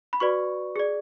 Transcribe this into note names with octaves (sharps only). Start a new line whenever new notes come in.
B5
F#4 B4 D5 C#6
G#4 D5